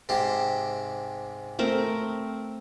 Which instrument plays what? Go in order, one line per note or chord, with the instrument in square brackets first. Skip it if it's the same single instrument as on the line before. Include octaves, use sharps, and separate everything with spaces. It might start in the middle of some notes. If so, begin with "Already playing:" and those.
[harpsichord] G#2 C3 G4
[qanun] A3 C4 A#4